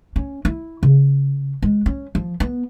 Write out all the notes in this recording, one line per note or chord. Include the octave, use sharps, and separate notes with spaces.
C#4
E4
C#3
G#3
C#4
F3
B3